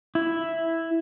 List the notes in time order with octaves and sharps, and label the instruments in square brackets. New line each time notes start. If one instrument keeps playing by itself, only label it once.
[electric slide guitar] E4